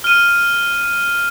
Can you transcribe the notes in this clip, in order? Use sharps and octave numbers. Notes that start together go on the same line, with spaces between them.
F6 D#7